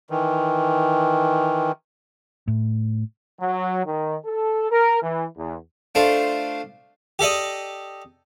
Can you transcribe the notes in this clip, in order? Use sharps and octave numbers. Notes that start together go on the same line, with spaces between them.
D#3 E3
A2
F#3
D#3
A4
A#4
E3
E2
A3 D4 F4 C5
G4 A4 D5 D#5